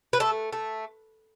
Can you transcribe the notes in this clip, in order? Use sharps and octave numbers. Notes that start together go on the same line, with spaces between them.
B4
A3 A4
A3